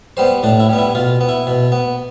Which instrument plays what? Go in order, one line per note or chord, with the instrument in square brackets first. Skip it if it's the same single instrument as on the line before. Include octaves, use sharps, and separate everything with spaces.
[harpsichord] G3 B3 C5
A2 D4
E4
G3 B3
E4
B2 F4
B3
E4
B2
B3